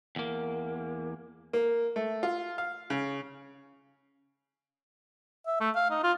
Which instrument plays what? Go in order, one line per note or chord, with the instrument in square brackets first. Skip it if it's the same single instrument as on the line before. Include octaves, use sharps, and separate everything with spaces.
[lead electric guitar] E2 A#3
[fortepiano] A#3
A3
F4
F5
C#3
[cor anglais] E5
A3
F5
D#4
F4